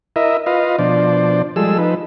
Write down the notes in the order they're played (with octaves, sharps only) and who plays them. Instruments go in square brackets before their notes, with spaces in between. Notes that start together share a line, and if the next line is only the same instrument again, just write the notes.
[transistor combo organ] E4 A#4 D#5 E5
F4 B4 D#5 F5
B2 F3 D4 C5 D5
F3 G3 G#3 G#4 A4 E6
F3 D#4 B4